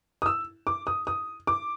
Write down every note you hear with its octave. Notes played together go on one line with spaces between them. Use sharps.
D#6
E6
D6
D#6
D#6
D6